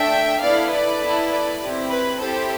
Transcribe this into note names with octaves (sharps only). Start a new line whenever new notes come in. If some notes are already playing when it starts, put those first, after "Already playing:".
Already playing: A3 D4 A4 E5 G5
B3 E4 A4 D5 F5
B4 D5
B3 E4 A4
B4 D5
C4 E4 G4
B4
C4 E4 G4 A4 C5